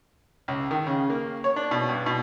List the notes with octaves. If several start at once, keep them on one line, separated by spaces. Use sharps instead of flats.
C#2
D#3
C#3
A#3
C#5
D4
B2
G2
B2